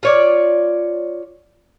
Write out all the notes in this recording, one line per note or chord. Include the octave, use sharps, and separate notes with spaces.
F4 C#5 D5